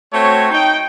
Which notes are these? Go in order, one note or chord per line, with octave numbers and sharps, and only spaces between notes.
A3 C4 F#4 C#5
D#4 G5